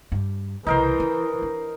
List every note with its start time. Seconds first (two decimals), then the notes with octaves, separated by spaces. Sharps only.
0.12 G2
0.67 C2 C#3 E3 D#4 A#4 C5
1.00 C#4
1.42 D4